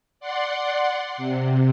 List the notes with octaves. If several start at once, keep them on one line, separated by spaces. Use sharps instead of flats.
D5 F#5 C6
C3